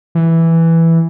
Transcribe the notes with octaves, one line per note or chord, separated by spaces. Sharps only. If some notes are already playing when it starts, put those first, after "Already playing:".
E3